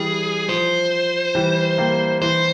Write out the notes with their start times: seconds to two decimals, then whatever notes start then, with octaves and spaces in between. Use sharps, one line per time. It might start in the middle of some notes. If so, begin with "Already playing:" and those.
Already playing: E3 G3 G#4
0.48 F3 C5
1.35 E3 G3
1.78 G3 A#3
2.22 E3 C5